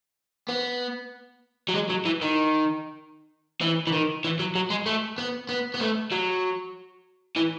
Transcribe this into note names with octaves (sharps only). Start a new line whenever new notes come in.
B3
F#3
G#3
F#3
E3
D#3
E3
E3
D#3
E3
F#3
F#3
G#3
A3
B3
B3
B3
A3
F#3
E3